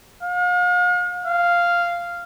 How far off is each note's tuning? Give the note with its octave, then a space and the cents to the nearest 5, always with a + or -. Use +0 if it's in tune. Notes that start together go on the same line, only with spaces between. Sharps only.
F5 +45
F5 -5